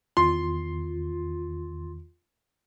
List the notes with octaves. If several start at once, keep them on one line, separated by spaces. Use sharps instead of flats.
E2 D#3 F4 C6